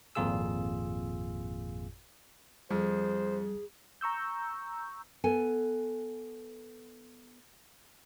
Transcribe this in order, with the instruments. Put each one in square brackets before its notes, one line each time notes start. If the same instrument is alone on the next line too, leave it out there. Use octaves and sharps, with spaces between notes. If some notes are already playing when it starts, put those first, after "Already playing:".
[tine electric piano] G#1 F2 A#2 F4 G#4 E6
[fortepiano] F2 [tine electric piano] G3 [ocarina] G#4 [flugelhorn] C5
[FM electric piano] A#5 C#6 E6 G6
[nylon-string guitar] B3 A4 G#5